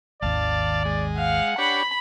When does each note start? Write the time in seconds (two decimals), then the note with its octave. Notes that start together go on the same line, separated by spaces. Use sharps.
0.22 G#1 D#2 D5 F5 A5
0.85 G#3
1.17 F5 F#5
1.58 D4 G4 C#5 B5